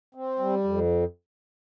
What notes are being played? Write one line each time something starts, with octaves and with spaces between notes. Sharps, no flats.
C4
G3
F2